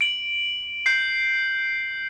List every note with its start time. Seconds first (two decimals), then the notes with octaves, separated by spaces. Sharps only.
0.01 D7 F#7
0.86 G6 C7